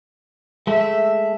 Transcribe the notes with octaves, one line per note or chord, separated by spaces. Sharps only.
G#3 A3 E5